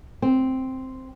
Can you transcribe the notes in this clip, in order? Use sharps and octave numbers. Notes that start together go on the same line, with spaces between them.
C4